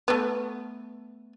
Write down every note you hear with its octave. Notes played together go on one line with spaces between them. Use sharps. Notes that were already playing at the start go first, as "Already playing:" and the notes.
A3 B3